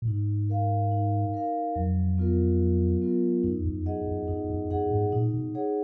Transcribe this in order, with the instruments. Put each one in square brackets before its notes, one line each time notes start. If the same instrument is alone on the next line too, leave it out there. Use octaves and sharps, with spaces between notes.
[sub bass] A#2
[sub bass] G#2 [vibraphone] D#4
[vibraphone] A#4 F5
D#4
A#4 F5
[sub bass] F2 [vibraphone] F#3
[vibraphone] B3 F4 A#4
F#3
B3 F4 A#4
[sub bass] F#2 [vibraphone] D#4
[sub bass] F2
F#2
F2
[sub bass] F#2 [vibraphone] G#4 D#5 F#5
[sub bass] F#2
[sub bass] F#2 [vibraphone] D#4
[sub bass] F#2
[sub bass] F#2 [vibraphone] G#4 D#5 F#5
[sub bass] G#2
[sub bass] A#2 [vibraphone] D#4
[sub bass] B2
[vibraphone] G#4 C#5 F#5